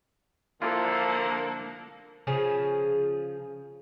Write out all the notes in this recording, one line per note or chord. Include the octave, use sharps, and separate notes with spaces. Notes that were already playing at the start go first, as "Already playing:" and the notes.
D3 F3 A#3 D4 E4 F4 A4
C#3 F3 G#4